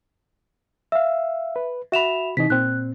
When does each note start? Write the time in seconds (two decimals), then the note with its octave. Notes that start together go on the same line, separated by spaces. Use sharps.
0.92 E5 F5 E6
1.56 B4
1.92 F#4 E5 B5 E7 F7
2.37 C3 E3 D#4 D#5 B6
2.50 A#2 C4 F#6